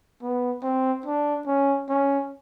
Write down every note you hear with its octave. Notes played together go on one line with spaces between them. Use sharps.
B3
C4
D4
C#4
C#4